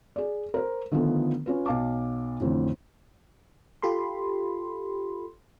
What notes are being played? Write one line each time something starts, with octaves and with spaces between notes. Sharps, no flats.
G#4 D5
A#4 C5
D3 D#3 F3 A3 B3 A4
C#4 F4 B4
B1 F5 A5 D6
A1 F2 A2 D3
F4 G4 A4 B5 C6